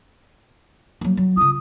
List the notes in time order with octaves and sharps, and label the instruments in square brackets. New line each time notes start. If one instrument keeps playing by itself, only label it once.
[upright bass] F#3 A#3
F#3
[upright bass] C#3 F4 [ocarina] D#6